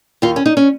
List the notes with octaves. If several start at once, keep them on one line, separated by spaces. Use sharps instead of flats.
D#2 F4
C#4
D#4
C#4